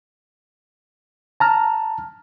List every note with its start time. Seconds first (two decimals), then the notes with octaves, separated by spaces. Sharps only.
1.40 A5 A#5 F6